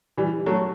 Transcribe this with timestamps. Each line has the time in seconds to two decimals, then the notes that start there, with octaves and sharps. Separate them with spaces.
0.17 E3 G3
0.46 F#3 A3